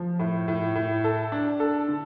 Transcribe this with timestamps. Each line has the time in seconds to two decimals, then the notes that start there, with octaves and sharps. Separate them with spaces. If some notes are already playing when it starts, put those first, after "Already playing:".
Already playing: F3
0.19 A2
0.48 A2
0.75 A2
1.04 A4
1.32 D4
1.60 A4
1.88 D3